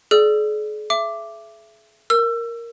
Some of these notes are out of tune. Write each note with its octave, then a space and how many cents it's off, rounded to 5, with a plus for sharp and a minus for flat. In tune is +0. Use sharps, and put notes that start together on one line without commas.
G#4 +40 D5 +0 E6 +45
E5 +25 D6 +0
A#4 +0 E6 +25